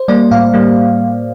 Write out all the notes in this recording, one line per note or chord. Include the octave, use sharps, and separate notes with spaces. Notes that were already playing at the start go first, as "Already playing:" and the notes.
Already playing: C5
G3 A#3 D5
A2 F5
G3 A#3